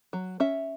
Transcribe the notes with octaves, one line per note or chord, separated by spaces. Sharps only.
F#3
C#4 E5